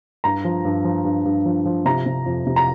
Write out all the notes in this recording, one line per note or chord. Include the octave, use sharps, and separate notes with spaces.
G2 A#5
F3
G2
F3
G2
G2
F3
F3
C3 A#5
C3
F2
C3
A#5